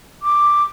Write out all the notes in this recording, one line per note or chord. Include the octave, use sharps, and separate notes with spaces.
D6